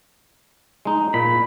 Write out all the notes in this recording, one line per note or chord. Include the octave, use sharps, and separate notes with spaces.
G#3 D#4
A#2 B5